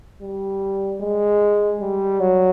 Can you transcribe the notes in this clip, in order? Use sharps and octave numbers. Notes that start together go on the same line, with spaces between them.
G3
G#3
G3
F#3